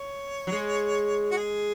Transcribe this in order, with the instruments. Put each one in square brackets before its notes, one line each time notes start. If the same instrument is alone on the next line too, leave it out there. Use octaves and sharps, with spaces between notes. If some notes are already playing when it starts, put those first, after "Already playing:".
Already playing: [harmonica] C#5
[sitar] F#3
G#3
[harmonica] F#4
G#4